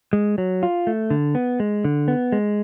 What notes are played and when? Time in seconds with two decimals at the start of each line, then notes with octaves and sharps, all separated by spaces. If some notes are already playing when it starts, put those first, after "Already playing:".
0.13 G#3
0.38 F#3
0.63 F4
0.87 A3
1.10 D3
1.35 B3
1.60 G#3
1.85 D3
2.08 B3
2.32 G#3